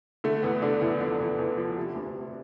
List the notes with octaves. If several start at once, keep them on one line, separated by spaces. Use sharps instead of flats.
D3 A3
E2 B3
D3 D4
E2 E4
F3 D4
E2
E2
F3
C3
D2
C3